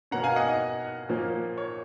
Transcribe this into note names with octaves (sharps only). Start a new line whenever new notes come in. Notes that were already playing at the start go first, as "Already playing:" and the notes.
B2 A#3 C#4 F#5 A#5
F5 G#5
D#5 F#5
D#5
A#2 F3 A#3 C#4
C#5